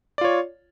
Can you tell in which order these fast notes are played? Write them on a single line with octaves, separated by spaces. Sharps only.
D5 F4 C#5